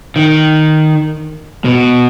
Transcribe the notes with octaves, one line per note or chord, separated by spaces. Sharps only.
D#3
B2